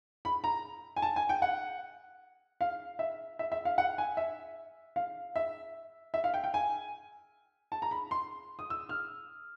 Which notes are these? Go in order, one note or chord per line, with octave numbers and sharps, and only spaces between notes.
B5
A#5
G#5
A5
G#5
G5
F#5
F5
E5
E5
E5
F5
F#5
G#5
E5
F5
E5
E5
F5
G5
G5
G#5
A5
A#5
B5
C6
D#6
E6
F6